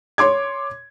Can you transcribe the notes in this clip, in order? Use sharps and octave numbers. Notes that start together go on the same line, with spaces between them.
C#5 C6 D6 G#6